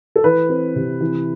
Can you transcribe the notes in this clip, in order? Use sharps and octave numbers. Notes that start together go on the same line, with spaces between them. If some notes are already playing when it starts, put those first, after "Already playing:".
A4
E3 B4
C4
C3
E3